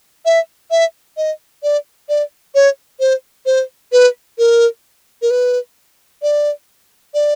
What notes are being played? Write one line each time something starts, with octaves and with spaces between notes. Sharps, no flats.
E5
E5
D#5
D5
D5
C#5
C5
C5
B4
A#4
A#4
B4
D5
D5